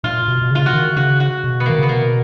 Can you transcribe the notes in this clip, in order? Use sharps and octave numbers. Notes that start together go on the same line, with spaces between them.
A#2 F4
B2
B2
C#3 F4
F#4
D#3
C#3 F#4
F#4
B2
B3
D#3 A#3
C#3 B3
B2 A#3